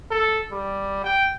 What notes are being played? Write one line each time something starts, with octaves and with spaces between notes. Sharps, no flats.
A4
G3
G5